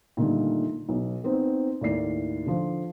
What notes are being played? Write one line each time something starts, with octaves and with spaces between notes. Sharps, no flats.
A#2 D3 D#3 G3 A3
B1
B3 C4 D#4
D#2 A2 D5 C7
D3 F3